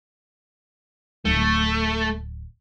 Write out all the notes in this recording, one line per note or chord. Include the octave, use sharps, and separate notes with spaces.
D1 A3